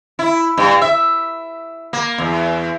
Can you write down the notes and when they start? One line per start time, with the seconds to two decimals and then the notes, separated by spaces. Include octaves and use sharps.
0.19 E4
0.57 G2
0.81 E5
1.93 A#3
2.18 E2